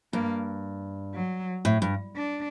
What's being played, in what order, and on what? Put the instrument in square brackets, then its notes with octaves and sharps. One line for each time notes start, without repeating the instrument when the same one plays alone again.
[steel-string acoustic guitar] G2 [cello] A#3
[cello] F#3
[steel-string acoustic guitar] A2
G2
[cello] D4